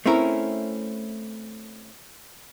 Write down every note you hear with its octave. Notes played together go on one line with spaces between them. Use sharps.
A3 C4 C#4 E4 A#4